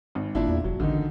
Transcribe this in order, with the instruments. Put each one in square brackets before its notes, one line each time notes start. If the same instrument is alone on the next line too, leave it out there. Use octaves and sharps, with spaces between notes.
[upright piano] G#1
[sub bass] G#1 [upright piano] A#2 D4 E4
[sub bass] E2
[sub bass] E1 [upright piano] F#3
[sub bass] A1 [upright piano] D3 D#3 D#4